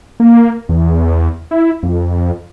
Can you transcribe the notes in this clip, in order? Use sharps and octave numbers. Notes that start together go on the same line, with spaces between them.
A#3
E2
E4
F2